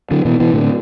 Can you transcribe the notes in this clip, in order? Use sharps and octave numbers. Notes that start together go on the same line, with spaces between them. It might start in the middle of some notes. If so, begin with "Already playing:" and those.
D3 F#3
B2 E3
B2 E3
A2 D3